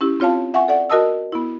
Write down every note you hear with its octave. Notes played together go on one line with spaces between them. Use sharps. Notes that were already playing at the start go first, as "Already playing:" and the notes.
C#4 E4 G4
C4 F4 C#5 F5 A5
E5 F#5 G#5 C#6
A4 D5 F#5
F#4 A#4 D#5 A5 D#6 E6
B3 E4